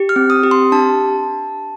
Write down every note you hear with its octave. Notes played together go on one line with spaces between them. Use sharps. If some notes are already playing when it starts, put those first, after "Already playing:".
Already playing: G4
F6
C4
D#6
G4
C6
D4 A5